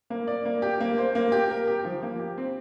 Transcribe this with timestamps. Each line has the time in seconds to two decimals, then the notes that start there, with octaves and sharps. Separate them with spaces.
0.10 A#3
0.27 D5
0.45 A#3
0.62 G4
0.80 A#3
0.98 C5
1.15 A#3
1.32 G4
1.50 A#4
1.67 G4
1.85 F3
2.03 A#3
2.19 G4
2.38 C4